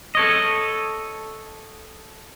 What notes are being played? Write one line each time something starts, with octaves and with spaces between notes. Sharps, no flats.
A4 C#5 D#5